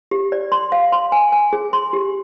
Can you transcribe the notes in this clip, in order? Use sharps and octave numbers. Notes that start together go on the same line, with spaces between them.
G4
D5
C6
F5
C6
G#5
G#5
G#4
C6
G4